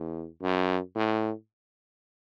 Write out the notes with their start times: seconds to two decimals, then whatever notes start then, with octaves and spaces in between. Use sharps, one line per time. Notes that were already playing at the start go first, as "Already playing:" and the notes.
Already playing: E2
0.42 F#2
0.95 A2